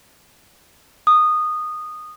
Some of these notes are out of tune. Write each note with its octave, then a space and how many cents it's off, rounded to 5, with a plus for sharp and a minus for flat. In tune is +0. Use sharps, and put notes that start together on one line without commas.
D#6 -15